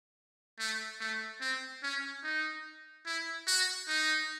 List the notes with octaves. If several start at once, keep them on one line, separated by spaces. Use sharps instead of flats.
A3
A3
C4
C#4
D#4
E4
F#4
D#4